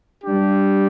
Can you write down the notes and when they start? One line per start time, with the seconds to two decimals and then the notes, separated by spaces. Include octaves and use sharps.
0.23 G3 D4 G4